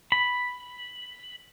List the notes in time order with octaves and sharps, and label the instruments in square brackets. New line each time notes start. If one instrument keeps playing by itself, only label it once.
[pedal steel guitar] B5